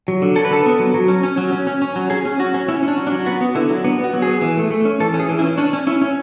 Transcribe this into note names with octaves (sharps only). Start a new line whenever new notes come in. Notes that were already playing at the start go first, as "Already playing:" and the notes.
F#3
D3
F#3 A4
B4
D3 A4
B3
F#3
F#3
C#4
C#4
F#3
C#4
C#4
C#4
F#3
C#4 G#4
C#4
F#3 F#4
C#4
C#4 E4
C#4
D4
F#3
D4
F#3
B3 F#4
B3
D3 E4
F#3
B3 D4
B3
F#4
F#3
B3 G#4
E3
A3
A3
C#4
E3 A4
C#4
G#4
E3
E4
C#4
C#4 D4
C#4
C#4 E4
C#4